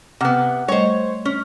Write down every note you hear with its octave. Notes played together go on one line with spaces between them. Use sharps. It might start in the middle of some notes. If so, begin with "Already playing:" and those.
C3 B3 F#5 D6 F6
G3 A3 C5 C#5 D#5
C#4